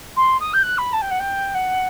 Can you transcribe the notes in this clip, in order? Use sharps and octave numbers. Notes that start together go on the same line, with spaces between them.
C6
D#6
G6
F#6
B5
A5
G5
F#5
G5
F#5